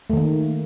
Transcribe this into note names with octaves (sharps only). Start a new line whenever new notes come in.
D#3 A3 A#3